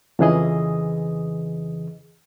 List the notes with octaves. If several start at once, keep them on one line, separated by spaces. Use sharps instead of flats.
F2 C#3 E3 G#4 D#5